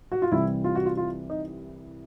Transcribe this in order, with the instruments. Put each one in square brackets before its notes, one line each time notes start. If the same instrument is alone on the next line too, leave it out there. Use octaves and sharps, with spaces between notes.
[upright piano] F#4
F4
C2 C3 E3 G3 C4 E4
F4
F#4
F4
F4
D#4